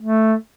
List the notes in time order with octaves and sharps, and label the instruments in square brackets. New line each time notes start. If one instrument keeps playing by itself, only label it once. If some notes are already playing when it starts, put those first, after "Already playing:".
[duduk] A3